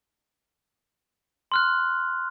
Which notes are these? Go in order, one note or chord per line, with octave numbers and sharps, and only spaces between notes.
C6 F6 F#6